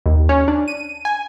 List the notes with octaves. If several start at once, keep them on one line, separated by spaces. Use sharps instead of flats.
D#2
C#4
D4
D#7
G#5